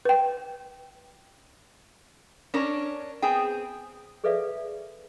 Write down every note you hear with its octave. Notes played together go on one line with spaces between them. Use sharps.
B4 G5
C#4 D4 A#4
B3 C4 G#4 G5
G#4 A4 B4 D5 E5 F5